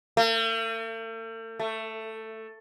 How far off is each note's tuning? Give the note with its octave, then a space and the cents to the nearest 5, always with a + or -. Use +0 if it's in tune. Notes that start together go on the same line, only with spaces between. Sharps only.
A3 +45
A3 +10